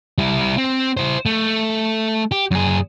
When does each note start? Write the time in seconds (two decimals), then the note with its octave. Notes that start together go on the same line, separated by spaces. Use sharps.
0.18 G3 E4
0.58 C4
0.97 E4 C5
1.26 A3
2.31 G4
2.51 F#2 G#4